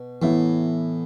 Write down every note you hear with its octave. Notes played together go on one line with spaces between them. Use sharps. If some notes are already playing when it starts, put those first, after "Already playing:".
Already playing: B2
A2 E3 B3 E4